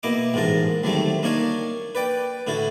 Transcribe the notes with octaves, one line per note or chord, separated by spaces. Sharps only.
B2 A#3 E4 D#5 D6
A1 G#2 F4 A#4 A5
D2 D#3 F#3 G3 A3 C4
A#3 D4 D#4 C#5 F5
B4 D5 G5
A2 D3 E4 F#4 A4